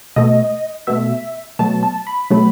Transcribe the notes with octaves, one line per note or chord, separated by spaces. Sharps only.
B2 A3 D#5
B2 A3 E5
B2 F#3 A3 A5
A5
B5
B2 F#3 A3